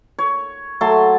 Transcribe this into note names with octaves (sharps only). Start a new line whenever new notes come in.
C#5
F#3 A3 A5 C6